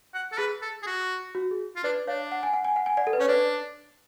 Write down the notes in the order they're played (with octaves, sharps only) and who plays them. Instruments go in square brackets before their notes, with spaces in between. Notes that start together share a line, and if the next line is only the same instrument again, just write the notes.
[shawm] F#5
A4
[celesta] G#4 [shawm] B4
[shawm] A4
G#4
F#4
[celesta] F#4
G#4
[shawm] F4
[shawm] D4 [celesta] B4 D5
[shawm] D4 [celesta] C#5 F5
[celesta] F#5
G#5
F#5
G#5
F#5
G#5
D5 F#5
A4
B4
[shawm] C#4 [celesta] C#5
[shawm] D4 [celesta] B4 D5